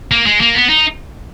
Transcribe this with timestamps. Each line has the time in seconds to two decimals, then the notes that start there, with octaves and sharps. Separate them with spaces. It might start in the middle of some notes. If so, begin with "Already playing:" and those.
0.11 A#3
0.26 G#3
0.41 A#3
0.55 B3
0.70 D#4